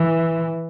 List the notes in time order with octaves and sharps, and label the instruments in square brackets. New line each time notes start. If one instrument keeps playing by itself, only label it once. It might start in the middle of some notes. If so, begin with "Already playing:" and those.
Already playing: [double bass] E3